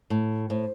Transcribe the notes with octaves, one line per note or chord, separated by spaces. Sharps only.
A2
A2 C5